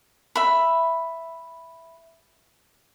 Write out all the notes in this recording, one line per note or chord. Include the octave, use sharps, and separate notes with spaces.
E5 B5